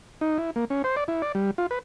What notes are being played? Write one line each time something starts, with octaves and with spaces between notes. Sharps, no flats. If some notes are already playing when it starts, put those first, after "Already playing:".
D#4
E4
A#3
C#4
C5
D5
E4
D5
G3
F4
B4